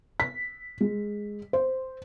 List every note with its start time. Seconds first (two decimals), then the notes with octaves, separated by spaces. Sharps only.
0.20 B6
0.80 G#3
1.53 C5